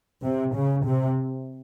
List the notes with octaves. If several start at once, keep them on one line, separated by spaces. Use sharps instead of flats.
C3
C#3
C3